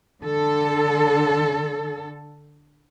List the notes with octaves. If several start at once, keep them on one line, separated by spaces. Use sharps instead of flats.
D3 A4